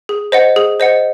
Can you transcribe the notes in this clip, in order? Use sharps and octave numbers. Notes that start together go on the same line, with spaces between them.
G#4
C5 D#5 F#5
G#4
C5 D#5 F#5